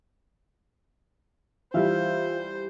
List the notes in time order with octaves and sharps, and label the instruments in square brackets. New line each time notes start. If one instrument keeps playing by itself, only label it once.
[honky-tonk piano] E3 G3 [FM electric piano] F4 E5 F5 [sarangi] C5